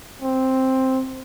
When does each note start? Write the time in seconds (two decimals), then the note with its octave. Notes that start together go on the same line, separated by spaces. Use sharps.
0.22 C4